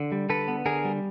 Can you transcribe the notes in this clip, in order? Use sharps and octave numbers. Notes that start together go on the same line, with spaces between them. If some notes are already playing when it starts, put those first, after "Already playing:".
Already playing: D3
G3
D3 A4 B4
B3
D3 G#4 A#4
G3